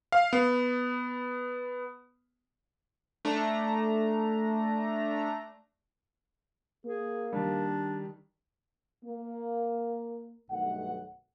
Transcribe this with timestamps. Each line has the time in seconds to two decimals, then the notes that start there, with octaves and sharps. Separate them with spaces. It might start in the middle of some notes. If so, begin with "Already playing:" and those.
0.12 F5
0.33 B3
3.25 A3 D4 A#5
6.85 A#3 G#4
7.32 D#3 G3 D4
9.05 A#3
10.50 B1 G2 D#3 A3 F#5